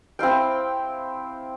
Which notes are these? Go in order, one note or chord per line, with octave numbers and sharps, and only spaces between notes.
C4 E4 F5 G5